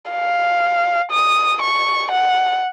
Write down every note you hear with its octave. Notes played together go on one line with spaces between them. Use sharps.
F5
D#6
C#6
F#5